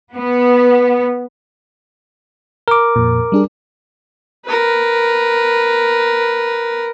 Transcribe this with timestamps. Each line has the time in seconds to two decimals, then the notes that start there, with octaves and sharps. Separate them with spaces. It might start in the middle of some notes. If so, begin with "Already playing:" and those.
0.16 B3
2.68 A#4 D6
2.96 F2 A#2
3.32 G3 D4 G#4
4.45 A#4 B4